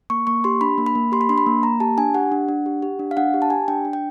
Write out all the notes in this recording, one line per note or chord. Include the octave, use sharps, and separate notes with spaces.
A#3 C#6
A#3 C#6
G4 C6
D4 B5
A#3
B5
A#3
G4 C6
B5
D4 C6
B5
A#3
A#3 A#5
G4 A5
D4 G#5
G4 F#5
D4
D4
G4
G4
D4
F5
D4 F#5
G4
A5
G4 G#5
D4 G5
D4
G5